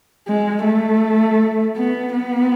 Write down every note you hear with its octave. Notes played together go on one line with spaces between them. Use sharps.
G#3
A3
B3
B3